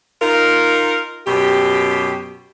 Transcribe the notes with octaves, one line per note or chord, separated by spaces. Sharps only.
D#4 F4 A#4
F#2 B2 G4